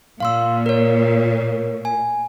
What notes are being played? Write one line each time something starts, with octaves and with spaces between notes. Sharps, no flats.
A#2 F5 C6 E6
A#4 C#5
G#5